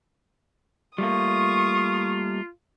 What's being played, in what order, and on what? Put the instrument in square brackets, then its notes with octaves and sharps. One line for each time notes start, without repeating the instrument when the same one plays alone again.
[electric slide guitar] G3 A3 A#3 [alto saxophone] F4 [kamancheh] C#6 D#6